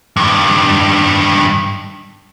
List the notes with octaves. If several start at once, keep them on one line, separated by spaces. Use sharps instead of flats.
G2 D#3